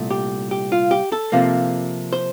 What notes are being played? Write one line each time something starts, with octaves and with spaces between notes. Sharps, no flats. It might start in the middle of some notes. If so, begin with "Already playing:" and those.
Already playing: C2 A#2 A3
G4
G4
F4
G4
A4
C3 F3 A#3
C5